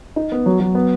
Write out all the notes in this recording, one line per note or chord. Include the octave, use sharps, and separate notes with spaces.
D#4
B3
F#3
F#3
B3